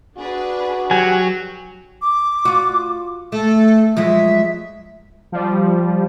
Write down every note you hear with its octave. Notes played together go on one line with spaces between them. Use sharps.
D4 F#4 G#4 B4
F#3 G4 F#5 G#5
D6
F4 F#4
A3 A4
F3 F#3 G#3 E5
F3 G3